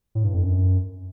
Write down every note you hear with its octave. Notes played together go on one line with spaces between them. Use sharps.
A2
G2
F2
F#2